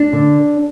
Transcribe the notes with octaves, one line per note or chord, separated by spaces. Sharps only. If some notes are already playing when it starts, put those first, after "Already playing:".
Already playing: D4
D3